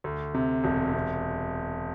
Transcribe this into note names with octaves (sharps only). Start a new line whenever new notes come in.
D2
C3
E1
C3